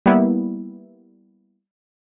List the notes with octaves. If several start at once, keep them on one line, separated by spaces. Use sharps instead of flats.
G3 A#3 B3 E4